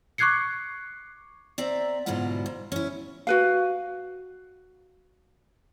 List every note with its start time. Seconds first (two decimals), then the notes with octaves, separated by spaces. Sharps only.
0.18 C#6 D6 F#6 G#6 C7 C#7
1.58 C4 D5 E5 A#5
2.06 G#2 B2 D3 F#3 E4 F4
2.46 G#2
2.72 C#4 E4
3.27 F#4 B4 F5